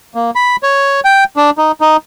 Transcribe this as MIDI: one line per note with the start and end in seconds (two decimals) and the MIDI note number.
0.15 0.31 58
0.35 0.56 83
0.63 1.00 73
1.05 1.24 79
1.37 1.50 62
1.58 1.72 63
1.81 1.97 63